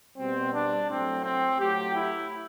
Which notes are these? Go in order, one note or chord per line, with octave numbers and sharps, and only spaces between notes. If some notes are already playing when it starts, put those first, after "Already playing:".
B2 G3 C4
D4
A2 F#3 A3 C4
C4
A2 F#3 A3 G4
E4